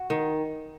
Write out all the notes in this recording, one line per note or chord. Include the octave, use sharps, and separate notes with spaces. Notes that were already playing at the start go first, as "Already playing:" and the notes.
Already playing: F#4
D#3